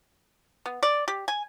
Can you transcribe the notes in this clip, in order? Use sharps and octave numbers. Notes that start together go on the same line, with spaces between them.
B3
D5
G4
G#5